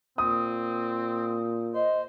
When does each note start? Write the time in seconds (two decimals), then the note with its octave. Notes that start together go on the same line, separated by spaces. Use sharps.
0.18 A#2 C4 D#6
1.74 C5 D#5